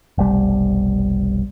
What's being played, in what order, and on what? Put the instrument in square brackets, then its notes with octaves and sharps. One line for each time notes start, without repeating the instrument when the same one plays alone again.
[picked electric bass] F1 B1 G3